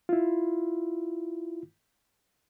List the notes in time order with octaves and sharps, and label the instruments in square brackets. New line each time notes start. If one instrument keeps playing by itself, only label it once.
[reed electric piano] E4 F4